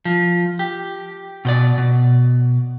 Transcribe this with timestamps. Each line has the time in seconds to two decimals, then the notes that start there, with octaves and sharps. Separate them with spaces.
0.05 F3
0.59 G4
1.45 B2 C5 D5
1.78 B2